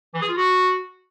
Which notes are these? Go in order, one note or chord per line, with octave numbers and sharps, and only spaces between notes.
E3
G#4
F4
F#4